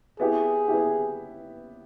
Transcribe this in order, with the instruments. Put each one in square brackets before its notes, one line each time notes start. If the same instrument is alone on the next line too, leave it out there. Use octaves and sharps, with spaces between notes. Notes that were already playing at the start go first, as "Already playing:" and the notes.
[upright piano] B3 E4 G4 [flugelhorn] G#4
[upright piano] B3 E4 G4